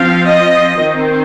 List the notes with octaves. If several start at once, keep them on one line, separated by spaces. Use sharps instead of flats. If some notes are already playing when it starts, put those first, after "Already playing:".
Already playing: F3 C4 F5
D#5
D#3 C4